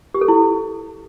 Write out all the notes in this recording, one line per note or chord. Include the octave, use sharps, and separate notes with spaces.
G4
A4
E4